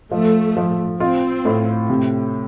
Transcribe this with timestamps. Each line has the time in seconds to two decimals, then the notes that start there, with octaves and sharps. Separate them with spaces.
0.11 F3 A3
0.57 F3
1.00 C4 F4
1.45 A2
1.89 C3